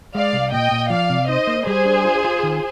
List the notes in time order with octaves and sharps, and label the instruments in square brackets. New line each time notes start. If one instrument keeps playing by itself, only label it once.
[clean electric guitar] G#3 [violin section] D5 F5
[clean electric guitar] C2
[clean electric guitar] A#2 [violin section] D#5 G5
[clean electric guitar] A#2
[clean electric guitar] F3 [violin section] D5 F5
[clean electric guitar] C3
[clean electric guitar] D#4 [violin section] C5 D#5
[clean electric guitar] A#3
[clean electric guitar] G3 [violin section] G#4 C5
[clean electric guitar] D4
F4
F4
D#3